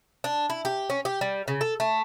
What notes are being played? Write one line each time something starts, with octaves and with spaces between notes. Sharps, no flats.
D4
E4
G4
C#4
G4
G3
C#3
A4
A3